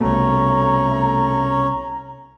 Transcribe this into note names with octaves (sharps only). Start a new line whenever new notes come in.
C2 B2 A3 C#4 A#5